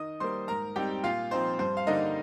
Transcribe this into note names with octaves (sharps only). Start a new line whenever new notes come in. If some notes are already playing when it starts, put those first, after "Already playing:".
Already playing: D#3 D#5 D#6
G3 A#3 C5 C6
G#2 A#4 A#5
G3 C4 D#4 G4 G5
A#2 F4 F5
F3 C4 D#4 C5
G2 C5
F5
D3 G3 A#3 D#4 D#5